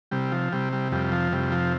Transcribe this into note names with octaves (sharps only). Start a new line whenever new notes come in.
C3 G3
F3
C3 G3
G3
F2 G3
F3
C3 G3
F3